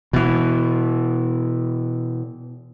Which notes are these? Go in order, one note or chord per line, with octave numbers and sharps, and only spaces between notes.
B2 E3